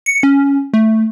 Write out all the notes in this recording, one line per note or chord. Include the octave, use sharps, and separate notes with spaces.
C#7
C#4
A3